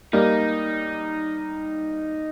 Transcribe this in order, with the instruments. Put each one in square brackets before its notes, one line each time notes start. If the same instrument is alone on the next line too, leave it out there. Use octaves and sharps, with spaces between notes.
[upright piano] G3 A#3 [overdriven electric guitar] D#4